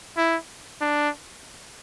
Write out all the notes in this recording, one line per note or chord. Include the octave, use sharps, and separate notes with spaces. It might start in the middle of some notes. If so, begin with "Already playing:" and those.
E4
D4